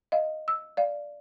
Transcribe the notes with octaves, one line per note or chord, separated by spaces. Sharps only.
D#5 F5
E6
D5 F5